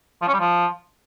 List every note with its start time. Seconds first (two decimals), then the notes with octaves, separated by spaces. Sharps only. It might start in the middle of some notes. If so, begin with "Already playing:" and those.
0.22 F3
0.27 C#4
0.33 G3
0.39 F3